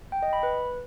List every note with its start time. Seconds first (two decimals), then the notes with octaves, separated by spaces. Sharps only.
0.12 G5
0.22 D#5
0.33 B5
0.43 B4